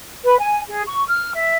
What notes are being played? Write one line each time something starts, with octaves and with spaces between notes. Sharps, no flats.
B4
G#5
G#4
C#6
F6
E5